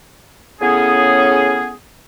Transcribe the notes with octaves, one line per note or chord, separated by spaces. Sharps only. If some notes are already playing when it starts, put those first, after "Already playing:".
A2 C#3 B3 C#4 G#4